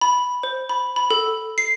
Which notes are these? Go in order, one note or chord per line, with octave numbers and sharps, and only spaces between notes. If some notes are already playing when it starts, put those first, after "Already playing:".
B5
C5
B5
B5
A4
C7